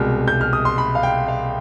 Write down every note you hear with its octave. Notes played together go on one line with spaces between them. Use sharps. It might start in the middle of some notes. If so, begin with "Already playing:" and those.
Already playing: C2 B2 G#3 F6
G6
F6
D#6
C6
B5
F5
G5
F5